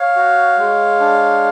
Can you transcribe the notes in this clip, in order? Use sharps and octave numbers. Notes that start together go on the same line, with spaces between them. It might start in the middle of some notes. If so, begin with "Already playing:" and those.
Already playing: C#5 F5
F#4
G#3
D4